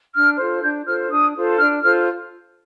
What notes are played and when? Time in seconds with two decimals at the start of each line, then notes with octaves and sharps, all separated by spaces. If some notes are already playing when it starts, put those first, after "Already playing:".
0.15 D4 F6
0.38 F4 A4 C5
0.62 D4 G6
0.86 F4 A4 C5 F6
1.11 D4 D#6
1.35 F4 A4 C5
1.59 D4 F6
1.83 F4 A4 C5 F6